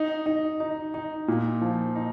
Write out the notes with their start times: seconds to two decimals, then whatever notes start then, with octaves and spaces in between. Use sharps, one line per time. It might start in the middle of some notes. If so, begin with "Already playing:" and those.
Already playing: D#4
0.26 D#4
0.60 D#4
0.94 D#4
1.28 A#2
1.61 F3
1.96 D#4